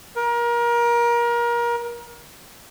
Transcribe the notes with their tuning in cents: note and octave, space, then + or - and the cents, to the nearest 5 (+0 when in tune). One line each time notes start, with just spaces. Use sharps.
A#4 +30